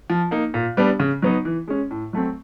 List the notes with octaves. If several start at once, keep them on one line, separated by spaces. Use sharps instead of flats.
F3
A#3 D#4
A#2
G3 B3 D4
C#3
F#3 B3 D#4
E3
G#3 C#4
A2
F#3 A3 C4